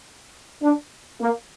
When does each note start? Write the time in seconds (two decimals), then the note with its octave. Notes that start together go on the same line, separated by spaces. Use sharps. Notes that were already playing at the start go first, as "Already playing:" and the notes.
0.62 D4
1.21 A#3